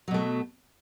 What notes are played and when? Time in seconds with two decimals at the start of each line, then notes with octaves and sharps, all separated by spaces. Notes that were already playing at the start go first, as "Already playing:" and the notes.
0.08 F#3
0.11 B2
0.14 A3